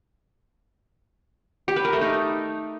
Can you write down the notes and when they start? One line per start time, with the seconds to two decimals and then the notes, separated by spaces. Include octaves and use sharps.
1.68 G4
1.76 B4
1.85 A#4
1.93 A3
2.01 D#4